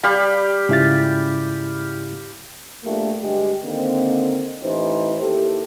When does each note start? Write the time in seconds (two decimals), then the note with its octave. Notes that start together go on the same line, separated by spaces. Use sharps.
0.03 G3 G4 F5 B5
0.69 G#2 C#3 E4 F4 A6
2.84 A#1 A3 A#3 D4 G4
3.21 D2 G2 G#3 G4
3.64 D3 D#3 A#3 C4
4.62 A1 E3 D#4 C5
5.21 D#2 E4 G4 A4